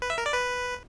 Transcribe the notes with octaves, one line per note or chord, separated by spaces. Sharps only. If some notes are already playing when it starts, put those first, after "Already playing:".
B4
E5
A#4
D5
B4